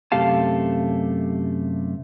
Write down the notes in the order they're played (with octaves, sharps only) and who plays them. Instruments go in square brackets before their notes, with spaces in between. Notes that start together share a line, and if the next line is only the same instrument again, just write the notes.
[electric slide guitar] F#2 C3 A3 G4 F5 A5